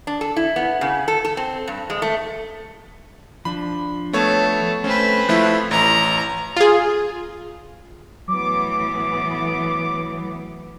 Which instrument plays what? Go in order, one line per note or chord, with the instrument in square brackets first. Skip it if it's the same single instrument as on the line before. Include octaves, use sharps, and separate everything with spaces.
[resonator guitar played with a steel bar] D4
A4
E4
B3
C#3
A4
A4
C4
G2
G#3
A3
[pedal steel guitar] F3 D4 [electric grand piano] B5
[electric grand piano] A3 B3 C#5 [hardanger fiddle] A4
[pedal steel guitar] A3 [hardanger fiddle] C4 B4 [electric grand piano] C#4
[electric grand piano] F3 A3 E4 [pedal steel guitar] F#6
[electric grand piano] A1 [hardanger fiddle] A#5
[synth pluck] F4 G#4
[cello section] A2 E3 B3 [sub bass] F#3 [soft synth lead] D6